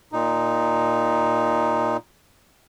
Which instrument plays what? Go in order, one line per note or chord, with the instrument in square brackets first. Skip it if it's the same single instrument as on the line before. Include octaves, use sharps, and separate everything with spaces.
[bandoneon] A#2 D#4